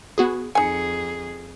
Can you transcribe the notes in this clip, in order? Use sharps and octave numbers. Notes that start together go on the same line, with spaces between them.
B3 F#4 G#4
F2 D#4 G#4 G#5 C#7